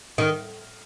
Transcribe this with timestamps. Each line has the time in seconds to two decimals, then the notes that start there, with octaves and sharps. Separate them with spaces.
0.18 D#3